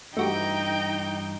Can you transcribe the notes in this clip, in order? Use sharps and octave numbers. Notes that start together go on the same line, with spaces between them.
G2 E3 A3 D#4 F#4 G4 G5